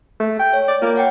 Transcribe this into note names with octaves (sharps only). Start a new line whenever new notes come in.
A3
G5
C#5
D5
A#3 F4
C#5 F#5 G5